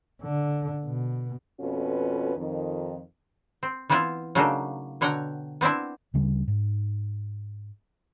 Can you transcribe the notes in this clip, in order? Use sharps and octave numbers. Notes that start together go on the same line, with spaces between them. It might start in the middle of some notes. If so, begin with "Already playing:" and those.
D3
B2
F2 B2 C#4 F4 A4 B4
F2 D#3
C4
E3 B3 C4 E4 F4
C#3 F#3 A3 A#3 D4 D#4
B2 D3 C#5 F#5 G5 A#5
B3 C4 D4 E4
D2 C#3 G3
G#2